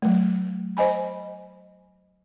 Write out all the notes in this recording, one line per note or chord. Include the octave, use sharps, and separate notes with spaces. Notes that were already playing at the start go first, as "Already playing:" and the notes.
F#3 A3
C5 D#5 G#5 B5